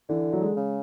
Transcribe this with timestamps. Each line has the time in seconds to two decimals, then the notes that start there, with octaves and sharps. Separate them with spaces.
0.09 D3 E3
0.33 F#3
0.41 G#3
0.57 C#3